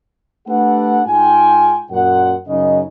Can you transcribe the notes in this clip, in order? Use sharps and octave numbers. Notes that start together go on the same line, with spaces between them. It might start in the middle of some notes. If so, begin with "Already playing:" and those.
A3 D4 G4 A4 B4 F#5
G#2 F4 G5 G#5
F#2 A#2 F#5
F#2 C#3 D#4 D#5